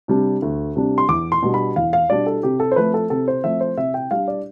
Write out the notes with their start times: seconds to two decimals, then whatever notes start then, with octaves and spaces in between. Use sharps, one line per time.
0.08 C3 G3 D4
0.42 D2
0.76 C3 G3 D4
0.98 C6
1.09 E2 D6
1.32 C6
1.43 B2 G3 D4
1.54 B5
1.76 E2 F5
1.93 F5
2.10 B2 G3 D4 D5
2.26 A4
2.43 C3 G4
2.60 A4
2.72 C5
2.76 F3 A3 C4 B4
2.94 A4
3.10 C3 A4
3.28 C5
3.44 F3 A3 C4 E5
3.61 C5
3.77 C3 E5
3.94 G5
4.11 G3 D4 F5
4.28 D5